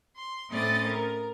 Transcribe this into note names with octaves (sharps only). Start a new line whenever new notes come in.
C6
A2 C4 C#4 D5 D#5 A6
A#4